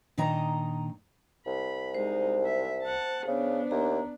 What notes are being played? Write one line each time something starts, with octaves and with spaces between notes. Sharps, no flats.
A#2 D#3 D4 D#4 D#5 A#5
C2 B5
G#3 D#4 C5
E5
F#5 A5
C#3 B3 D4
D#2 A#5